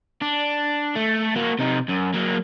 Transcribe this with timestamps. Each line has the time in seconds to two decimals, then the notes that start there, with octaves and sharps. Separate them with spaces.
0.22 D4
0.95 A3
1.36 A#3 F#4
1.59 C3 D#4
1.88 F#2
2.14 F#3 A#3